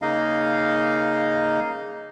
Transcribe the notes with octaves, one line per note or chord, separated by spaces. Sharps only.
C#3 A#3 D#4 D#5 F5